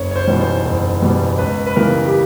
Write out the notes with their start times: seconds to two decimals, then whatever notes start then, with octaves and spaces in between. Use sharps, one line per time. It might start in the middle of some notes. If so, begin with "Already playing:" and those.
Already playing: F#1 C#5
0.11 C#5
0.16 C5
0.27 E2 B2 G3
0.41 C5
0.65 F#1
1.02 E2 B2 G3
1.38 C#2 B4
1.66 B4
1.76 C#3 E3 G3 B3 A#4
2.05 G4